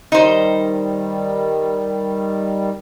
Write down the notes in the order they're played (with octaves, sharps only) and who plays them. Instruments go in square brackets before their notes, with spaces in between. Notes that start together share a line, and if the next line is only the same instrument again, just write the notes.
[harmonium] D#3 G3 [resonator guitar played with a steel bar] D#4 C5